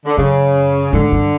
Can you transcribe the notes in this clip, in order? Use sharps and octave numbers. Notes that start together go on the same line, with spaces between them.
D3
F#2 C#3
G#2 D3
G2